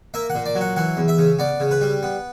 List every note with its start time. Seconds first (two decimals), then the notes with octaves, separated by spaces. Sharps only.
0.14 A#3 E5
0.30 A#2 F#5
0.46 D5
0.55 F#3
0.61 F#5
0.76 E3 F#5
0.97 E2
1.08 E5
1.18 C#3
1.39 B3 D5
1.60 C#3
1.71 B4
1.81 G3
2.03 B3